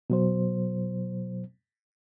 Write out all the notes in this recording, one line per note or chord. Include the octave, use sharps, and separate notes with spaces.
B2 F#3 C5